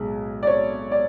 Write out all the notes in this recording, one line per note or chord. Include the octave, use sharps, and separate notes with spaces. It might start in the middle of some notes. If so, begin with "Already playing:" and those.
Already playing: B1 A2 G#3
D5
C#5
D5